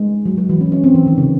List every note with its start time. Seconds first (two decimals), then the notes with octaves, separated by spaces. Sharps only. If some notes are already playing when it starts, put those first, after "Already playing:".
Already playing: G#3
0.26 F#3
0.38 F#3
0.49 E3
0.61 C#4
0.72 C#4
0.84 C4
0.94 E3
1.06 D#3
1.18 C#3